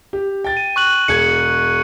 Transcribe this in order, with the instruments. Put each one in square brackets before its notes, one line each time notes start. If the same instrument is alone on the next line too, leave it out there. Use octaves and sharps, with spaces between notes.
[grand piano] G4
G5 A6
[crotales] D#7
C#6 F#6 F#7
[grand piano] E1 G#4 G#6 [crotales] C#7